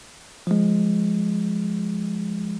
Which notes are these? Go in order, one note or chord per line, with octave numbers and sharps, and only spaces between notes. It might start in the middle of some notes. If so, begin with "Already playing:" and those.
F3 G#3